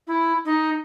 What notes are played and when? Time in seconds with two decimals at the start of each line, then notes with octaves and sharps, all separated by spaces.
0.07 E4
0.45 D#4